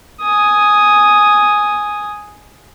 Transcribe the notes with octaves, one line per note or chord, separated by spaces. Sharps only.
G#5 D#6